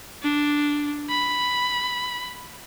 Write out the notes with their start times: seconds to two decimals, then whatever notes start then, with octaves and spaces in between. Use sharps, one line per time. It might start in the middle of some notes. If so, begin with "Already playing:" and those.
0.23 D4
1.10 B5